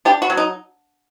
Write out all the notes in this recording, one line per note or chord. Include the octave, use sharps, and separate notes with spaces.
D4 G4
F#4
F#3
D#4